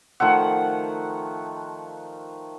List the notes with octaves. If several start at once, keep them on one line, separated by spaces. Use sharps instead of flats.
D#3 F3 A3 F#5